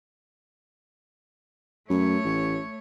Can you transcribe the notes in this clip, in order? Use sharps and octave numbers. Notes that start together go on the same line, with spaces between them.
F#2 A3 C#5
A1